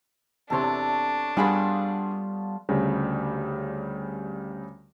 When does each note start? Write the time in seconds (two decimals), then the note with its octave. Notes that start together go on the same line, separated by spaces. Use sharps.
0.50 E2 C3 D4 A4 C#5 C6
1.37 G2 G3 B3 F4 G#4 A4 B5
2.69 D2 C#3 G3